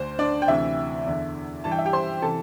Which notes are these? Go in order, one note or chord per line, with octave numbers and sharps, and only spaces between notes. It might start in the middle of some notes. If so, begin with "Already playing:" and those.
Already playing: D2 D3 C5
D4 D5
G5
D2 C3 E3 E4 E5
E2 D3
G2 E3 A5
G5
E5
G4 G5
C5 C6
C3 E3 A4 A5